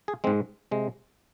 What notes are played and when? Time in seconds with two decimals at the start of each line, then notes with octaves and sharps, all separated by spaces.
0.08 G#4
0.24 G#3 C4
0.27 G#2
0.71 C3 G#3